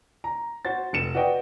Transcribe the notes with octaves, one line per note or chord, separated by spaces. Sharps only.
A#5
F#4 C5 A6
F1 C#7 E7
F#4 B4 D5 D#5 G5